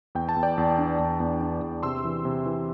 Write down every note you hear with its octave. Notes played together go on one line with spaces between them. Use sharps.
E2 G5
A5
E2
D5 G5
E2
D4
E2
E2
D4
E2
C3 C6 E6
E3
C3
E3